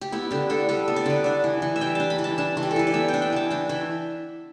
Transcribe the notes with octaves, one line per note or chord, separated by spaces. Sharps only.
G4
B3 E4
D3 G4
D4 A4
G3 A4
B3
D5
D3 B4
D4 D5
E3
E3
E5
G3 G5
D4 A5
B5
E3
A5
D4 A5
E3
G4
A4
E3 B4
D5
B3 E5
G5
D4
G5
E3 A5
D4 G5
E3 E5